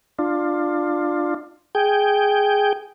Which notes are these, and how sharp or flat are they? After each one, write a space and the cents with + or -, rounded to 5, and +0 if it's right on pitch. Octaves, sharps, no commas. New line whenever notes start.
D4 +20 F4 +5
G#4 +0 G5 +0